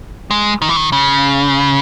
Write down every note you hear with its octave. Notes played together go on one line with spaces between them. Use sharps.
G#3
D#3
E3
D#3
C#3